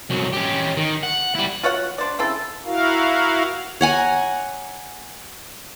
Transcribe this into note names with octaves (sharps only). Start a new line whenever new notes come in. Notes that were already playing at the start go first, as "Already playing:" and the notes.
C2 F#3
C#4 G4
D#3
F#5
G3 E4
F4 F#4 C#5 F#5
D4 C5 D5
C#3 C4 E4 A4
E4 F#4 A#4 F5
C#5 F#5 G#5 A#5